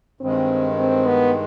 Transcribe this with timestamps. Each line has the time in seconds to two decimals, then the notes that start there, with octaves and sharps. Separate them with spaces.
0.21 G2 D#3 G#3 C4
0.78 C4
1.06 B3